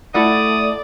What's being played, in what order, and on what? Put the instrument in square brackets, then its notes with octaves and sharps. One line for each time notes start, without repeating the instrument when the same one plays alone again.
[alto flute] A3 [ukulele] E4 A4 F#5 [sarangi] D5 [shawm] D#6